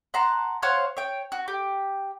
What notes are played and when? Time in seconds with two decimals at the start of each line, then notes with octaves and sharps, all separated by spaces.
0.14 F#5 A5 A#5 C6
0.62 C5 C#5 F5 F#5
0.97 C#5 G5
1.32 F#4
1.48 G4